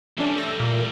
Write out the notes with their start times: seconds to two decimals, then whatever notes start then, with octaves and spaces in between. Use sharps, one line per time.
0.18 E3 G3 A3 C#4 D4
0.36 A3 E6 A#6
0.60 A#2